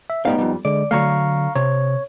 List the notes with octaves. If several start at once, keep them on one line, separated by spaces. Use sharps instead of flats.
E5
A2 G3 B3 D#4 F5
F2 G3
D3 G#3 D5
D3 F#3 A3 F5 A#5 C#6
C3 C#5